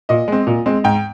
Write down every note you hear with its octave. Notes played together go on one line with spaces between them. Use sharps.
A#2 D#5
G#3 C4
A#2
G#3 C4
G#2 G5